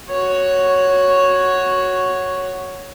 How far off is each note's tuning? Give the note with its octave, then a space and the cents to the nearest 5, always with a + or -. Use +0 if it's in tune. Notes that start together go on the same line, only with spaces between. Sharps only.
F#4 +0 C#5 +0